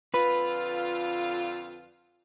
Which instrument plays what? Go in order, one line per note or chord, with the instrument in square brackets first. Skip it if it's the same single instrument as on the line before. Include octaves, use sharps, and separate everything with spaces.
[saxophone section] F2 D3 F4 [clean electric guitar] B4